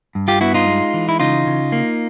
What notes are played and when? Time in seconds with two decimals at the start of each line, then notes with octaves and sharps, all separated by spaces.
0.15 G2
0.28 F4 G4
0.41 B3 E4 F#4
0.54 D#4 F4
0.67 G#3
0.94 E3
1.09 E4
1.20 C#3 D#4 F4
1.47 C#3
1.72 A#3